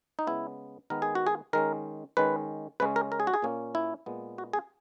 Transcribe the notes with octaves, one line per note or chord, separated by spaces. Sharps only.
D#4
C#3 G#3 B3 E4
D#3 G#3 B3 A#4
G#4
F#4
G#4
D#3 G#3 C#4 A#4
D#3 G#3 C#4 B4
C#3 G#3 C#4 B4
A#4
A#4
G#4
F#4
G#4
A#2 A#3 C#4
E4
A#2 G#3 B3
F#4
G#4